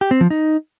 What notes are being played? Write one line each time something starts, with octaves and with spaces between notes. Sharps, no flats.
G4
C4
F3
D#4